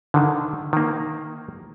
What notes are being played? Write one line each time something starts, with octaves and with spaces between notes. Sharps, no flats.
D3 D#3
D#3 A#3